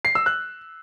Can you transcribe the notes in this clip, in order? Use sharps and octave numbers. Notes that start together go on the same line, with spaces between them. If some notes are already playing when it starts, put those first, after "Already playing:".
C7
E6
F#6